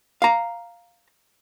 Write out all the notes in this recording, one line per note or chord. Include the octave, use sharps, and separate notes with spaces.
F5 A#5